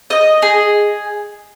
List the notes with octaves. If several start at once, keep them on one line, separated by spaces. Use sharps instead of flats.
D#5
G#4